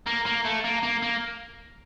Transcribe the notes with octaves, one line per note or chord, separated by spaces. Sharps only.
A#3
A#3
A3
A#3
A#3
A#3